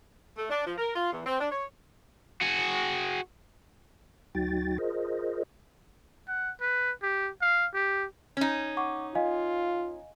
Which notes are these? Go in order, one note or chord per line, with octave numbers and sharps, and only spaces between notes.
A3
D4
F3
A#4
F4
E2
C4
D4
C#5
F#4 G#4
D2 F#3 D#4 F#4 G5 A6
F4 G#4 A#4 C5 D#5
F#5
B4
G4
F5
G4
C#4 D#4
F#5 C#6 D6
F4 D#5 F5 G#5